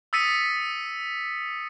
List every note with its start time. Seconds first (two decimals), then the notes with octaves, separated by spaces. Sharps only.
0.13 D#6 E6 A6 B6 C#7 D#7